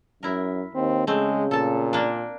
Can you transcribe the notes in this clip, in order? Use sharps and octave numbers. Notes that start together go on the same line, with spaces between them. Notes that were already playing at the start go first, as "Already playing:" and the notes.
F#2 E4 A#4
D#2 C4
C#3 G#3 A3 C4
A#2 A4 A5
A#3 D4